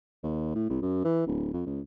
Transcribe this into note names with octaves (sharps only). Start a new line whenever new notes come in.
D#2
A2
C2
F#2
E3
D1
F2
C#2